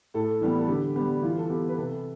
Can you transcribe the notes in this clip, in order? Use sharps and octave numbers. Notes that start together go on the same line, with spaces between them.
A2 A4
E3 G3 B3
A4
D3 G4
G3 B3 G4
E3 F4
A4
B3 G4
B4
C3 A4